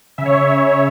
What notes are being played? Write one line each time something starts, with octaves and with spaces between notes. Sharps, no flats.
C#3 E5
C#5
E5
C#3